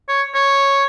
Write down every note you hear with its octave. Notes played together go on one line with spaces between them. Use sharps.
C#5
C#5